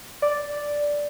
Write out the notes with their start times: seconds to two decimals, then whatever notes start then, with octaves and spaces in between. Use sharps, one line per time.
0.22 D5